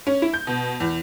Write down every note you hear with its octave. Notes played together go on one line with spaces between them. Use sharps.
C#4
E4
G6
B2
E2